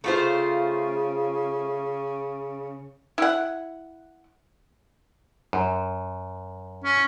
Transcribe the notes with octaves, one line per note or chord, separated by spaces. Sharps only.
C#3 A3 F4 C5
E4 F#5
F#2
C#4